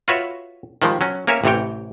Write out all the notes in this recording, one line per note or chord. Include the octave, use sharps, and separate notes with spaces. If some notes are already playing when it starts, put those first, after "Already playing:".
F4 F#4 B4 C#5 E5
D#3 F3 G3 G#3
F#3 C#4
A#3 C#4 A#4 C#5 E5 G#5
A1 C3 E3 C#5 G5